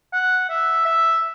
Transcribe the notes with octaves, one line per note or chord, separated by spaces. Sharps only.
F#5
E5
E5